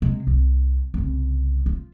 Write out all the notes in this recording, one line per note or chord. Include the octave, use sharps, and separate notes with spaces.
C3 G#3
C2
C2 C#3
F4